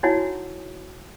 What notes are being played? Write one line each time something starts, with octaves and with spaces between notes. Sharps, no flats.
D#4 E4 F#4 C#5 F#5 G#5